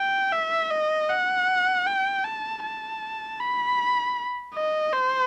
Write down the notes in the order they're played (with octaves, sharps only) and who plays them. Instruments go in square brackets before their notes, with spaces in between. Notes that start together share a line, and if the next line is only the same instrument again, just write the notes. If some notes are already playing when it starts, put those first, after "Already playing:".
Already playing: [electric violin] G5
E5
D#5
F#5
G5
A5
A5
B5
D#5
C5